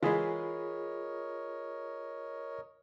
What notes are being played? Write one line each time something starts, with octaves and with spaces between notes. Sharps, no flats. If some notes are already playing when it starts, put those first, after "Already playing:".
E3 G#3 F4 G#4 A#4 C#5 D#5 B5